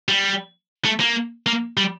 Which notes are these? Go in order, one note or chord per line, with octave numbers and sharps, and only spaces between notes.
G3
A3
A#3
A#3
G3